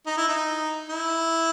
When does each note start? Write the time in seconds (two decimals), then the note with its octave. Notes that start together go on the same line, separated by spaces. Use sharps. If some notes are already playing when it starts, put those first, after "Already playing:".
0.06 D#4
0.17 E4
0.28 D#4
0.89 E4